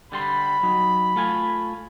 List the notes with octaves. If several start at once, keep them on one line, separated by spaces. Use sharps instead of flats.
D3 G3 B5 C6
F#3 D#4
A3 F4 G#5